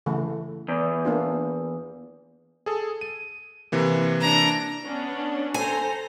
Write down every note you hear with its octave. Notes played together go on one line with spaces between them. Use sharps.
C#3 E3 A3
E2
A#3 D4 F4
G#4 A4
D#7
C3 E3 A#3
D4 A#5
B3 C#4 D4
A4 C5 G#5 A#5